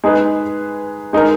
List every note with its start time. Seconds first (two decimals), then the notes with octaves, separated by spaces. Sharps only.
0.04 G#3 D#4 G#4 B4
1.13 G#3 D#4 A#4